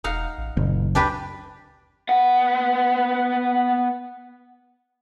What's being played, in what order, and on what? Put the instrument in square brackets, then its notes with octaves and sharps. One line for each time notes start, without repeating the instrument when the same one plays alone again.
[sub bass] E1 [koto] D#4 F5 F#5
[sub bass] A1
[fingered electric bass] F#1 [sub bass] A#2
[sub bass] D2 [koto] D4 G4 B4
[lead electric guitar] B3 F#5